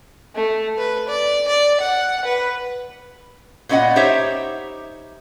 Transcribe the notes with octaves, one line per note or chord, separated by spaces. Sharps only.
A3
B4
D5
D5
F#5
B4
A#2 B3 C#4 D5 D#5 F#5
D#4 G4 C5 C#5 E5